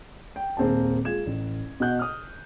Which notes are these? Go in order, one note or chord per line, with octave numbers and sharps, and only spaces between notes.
G5
D#1 A#3 C4 G#4 A5
G#3 F4 G#6 E7
A1
B2 F#4 D#5 F#6 G6
D#6 F6